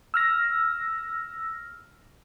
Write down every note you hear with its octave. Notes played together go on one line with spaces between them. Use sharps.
E6 F6 A#6